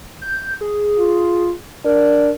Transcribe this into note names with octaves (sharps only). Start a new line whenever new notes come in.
G6
G#4
F4
D4 A#4